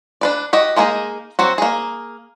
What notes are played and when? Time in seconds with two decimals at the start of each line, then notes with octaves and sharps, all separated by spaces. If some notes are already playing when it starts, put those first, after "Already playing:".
0.21 D4 B4 D5
0.53 F#4 G4 D#5
0.76 G#3 A#3 D#4 E4 G#4
1.39 F#3 C4 F#4
1.58 A#3 G#4